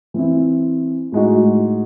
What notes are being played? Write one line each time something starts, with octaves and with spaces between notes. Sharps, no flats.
E3 C4 E4
A2 G#3 D#4 F#4